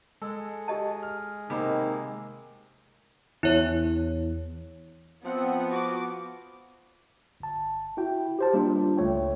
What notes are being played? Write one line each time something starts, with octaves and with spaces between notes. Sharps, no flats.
G#3 A4
G4 D#5 A5
F6
C3 D#3 A#3 B5
E2 E4 C#5
F3 B3 C4 F#5
F#4 D6
G1 A5
E4 F#4 G5
G4 C5 A5
G3 A#3 D4 F4
G#1 C#2 A3 C#5 G5